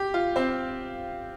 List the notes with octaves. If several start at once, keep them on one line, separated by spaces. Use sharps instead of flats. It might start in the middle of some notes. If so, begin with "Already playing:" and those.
Already playing: G4
F4
C4